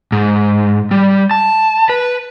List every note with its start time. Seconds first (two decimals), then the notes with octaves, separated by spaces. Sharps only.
0.12 G#2
0.91 G3
1.31 A5
1.90 B4